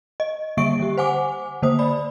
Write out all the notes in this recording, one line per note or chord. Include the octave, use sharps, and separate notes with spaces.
D#5
D3 G3 A#3 E5 C#6 D7
D3 G4
C5 F#5 G#5 D6
D3 A#3 C5 D#6
D5 B5